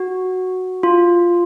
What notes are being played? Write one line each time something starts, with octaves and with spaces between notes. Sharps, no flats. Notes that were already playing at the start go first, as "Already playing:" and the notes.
Already playing: F#4
F4